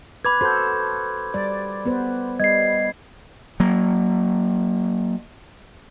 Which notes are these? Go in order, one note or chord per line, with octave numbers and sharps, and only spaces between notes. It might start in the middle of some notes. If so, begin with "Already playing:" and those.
B4 B5 D6 G#6
F#4 A4 C5 C6 G6
G3 D5
B3 B4 C5
G3 D#5 G#6 C7
F#3 A#3